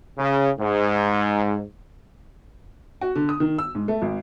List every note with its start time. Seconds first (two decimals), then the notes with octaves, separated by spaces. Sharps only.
0.18 C#3
0.59 G#2
3.01 F#4
3.15 D3
3.29 D#6
3.40 D#3
3.58 E6
3.75 G#2
3.88 A3
4.02 G#1